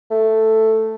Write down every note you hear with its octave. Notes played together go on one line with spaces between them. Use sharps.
A3